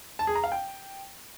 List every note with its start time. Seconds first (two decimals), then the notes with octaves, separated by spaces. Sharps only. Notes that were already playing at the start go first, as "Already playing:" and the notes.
0.19 A5
0.27 G#4
0.35 A#5
0.44 F5
0.52 G5